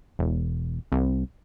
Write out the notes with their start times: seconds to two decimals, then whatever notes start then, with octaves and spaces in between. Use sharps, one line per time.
0.19 E1
0.92 C2